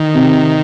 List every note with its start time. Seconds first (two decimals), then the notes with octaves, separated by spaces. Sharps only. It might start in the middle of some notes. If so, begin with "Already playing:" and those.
Already playing: D#3
0.14 C3